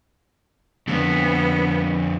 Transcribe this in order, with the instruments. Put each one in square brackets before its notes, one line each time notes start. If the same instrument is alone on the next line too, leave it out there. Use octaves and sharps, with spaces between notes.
[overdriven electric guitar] F2 D3 [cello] B3